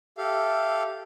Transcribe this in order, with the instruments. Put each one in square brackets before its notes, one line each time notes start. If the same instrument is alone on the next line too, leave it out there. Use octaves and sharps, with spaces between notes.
[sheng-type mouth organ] G4 A4 F5 [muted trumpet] E5